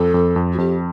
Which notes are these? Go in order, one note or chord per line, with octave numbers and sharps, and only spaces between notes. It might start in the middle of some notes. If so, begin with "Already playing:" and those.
Already playing: F2 A4
F2
F2
F#4
F2 G4